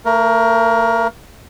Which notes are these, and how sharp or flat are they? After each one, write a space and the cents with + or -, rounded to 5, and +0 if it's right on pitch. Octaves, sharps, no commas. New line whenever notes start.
A3 +45 A#4 +15